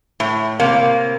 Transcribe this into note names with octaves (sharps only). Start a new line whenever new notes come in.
A2
C3 A#3